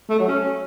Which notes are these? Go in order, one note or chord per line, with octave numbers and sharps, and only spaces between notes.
A3
F#3
C#4